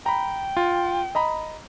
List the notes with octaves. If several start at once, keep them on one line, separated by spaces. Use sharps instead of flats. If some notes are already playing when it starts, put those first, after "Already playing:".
G5 A#5 B5
F4
D#5 A#5 B5